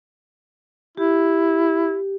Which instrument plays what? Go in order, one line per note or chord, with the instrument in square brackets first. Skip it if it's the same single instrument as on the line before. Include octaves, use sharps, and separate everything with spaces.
[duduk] E4 [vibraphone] G4